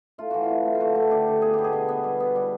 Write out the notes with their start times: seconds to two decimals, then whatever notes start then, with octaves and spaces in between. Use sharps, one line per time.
0.18 A3 F4
0.31 E3 F#4
0.43 F4
0.49 C3
0.65 A3
0.75 F4
0.80 D3 F#4
0.95 A3
1.11 D3 G4
1.27 D3
1.42 B3 G#4
1.54 B2 G4
1.64 G#4
1.73 B2
1.89 B3
2.04 G3
2.20 B3
2.36 G3